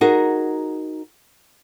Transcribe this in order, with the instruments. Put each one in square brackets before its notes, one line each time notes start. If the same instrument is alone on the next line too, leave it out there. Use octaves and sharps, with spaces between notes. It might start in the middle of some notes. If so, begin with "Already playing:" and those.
[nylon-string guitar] D#4 F#4 G#4 A#4